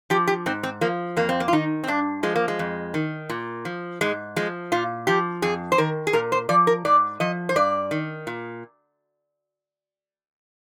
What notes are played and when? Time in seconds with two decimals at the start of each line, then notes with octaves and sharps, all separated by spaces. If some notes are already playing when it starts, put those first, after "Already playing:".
0.10 F3 G4
0.27 G4
0.46 G#2 C4
0.63 C4
0.81 F3 A#3
1.16 F2 A#3
1.29 C4
1.40 A#3
1.48 F4
1.53 D#3 D#4
1.84 C4
1.87 G2 D4
2.23 F3 G#3
2.36 A#3
2.48 G#3
2.59 F2
2.94 D#3
3.29 A#2
3.65 F3
4.01 G#2 G#3
4.36 F3 G#3
4.72 A#2 F4
5.07 F3 G4
5.42 F2 G#4
5.72 C5
5.78 D#3 A#4
6.07 G#4
6.13 A#2 A#4
6.32 C5
6.49 F3 D5
6.67 A#4
6.85 G#2 D5
7.20 F3 D#5
7.49 C5
7.56 G2 D5
7.91 D#3
8.27 A#2